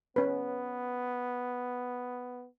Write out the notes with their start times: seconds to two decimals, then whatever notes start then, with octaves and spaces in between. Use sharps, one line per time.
0.16 B3 C#4 B4